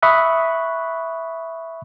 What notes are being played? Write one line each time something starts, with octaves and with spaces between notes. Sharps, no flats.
E5 B5 C#6 D#6 F#6